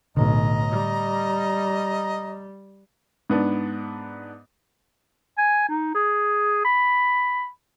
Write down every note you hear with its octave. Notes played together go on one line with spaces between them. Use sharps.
B1 A2 D3 D#5 A#5
G3
G#2 B3 D4
G#5
D#4
G#4
B5